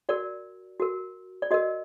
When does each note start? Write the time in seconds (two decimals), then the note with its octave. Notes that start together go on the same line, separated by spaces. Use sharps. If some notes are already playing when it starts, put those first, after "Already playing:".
0.09 F#4 A#4 D5
0.80 F#4 A#4
1.42 D5
1.51 F#4 A#4 D#5